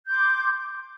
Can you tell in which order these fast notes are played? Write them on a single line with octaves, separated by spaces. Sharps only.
G6 D6 C6